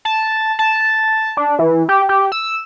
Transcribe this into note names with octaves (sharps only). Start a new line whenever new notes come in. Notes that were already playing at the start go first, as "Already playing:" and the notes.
A5
A5
D4
E3
G4
G4
E6